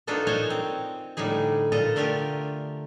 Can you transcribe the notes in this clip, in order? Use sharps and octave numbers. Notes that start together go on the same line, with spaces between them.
B3 D4 D#4 F4 F#4 A4
A#2 C5 C#5 D#5 G#5 A#5
C4
A2 D3 G3 D#4 G#4
A#2 F4 A4 D#5 A#5
D3 A3 F4 G4 A#4